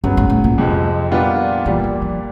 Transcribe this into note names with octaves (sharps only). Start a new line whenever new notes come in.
G2 C#3 F#3 B3
G#2
A2
A#2
F2 C3 F3 G#3
A#2 G3 B3 D4 F4
A#2 E3 G3 A#3
E3
F3